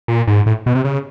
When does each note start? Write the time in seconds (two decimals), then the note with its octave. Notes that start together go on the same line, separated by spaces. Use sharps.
0.08 A#2
0.27 G#2
0.46 A2
0.66 B2
0.75 C3
0.85 C#3